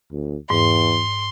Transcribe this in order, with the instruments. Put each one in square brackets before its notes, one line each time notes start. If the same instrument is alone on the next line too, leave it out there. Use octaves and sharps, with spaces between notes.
[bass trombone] D2
[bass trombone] E2 [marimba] G#2 [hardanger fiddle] C6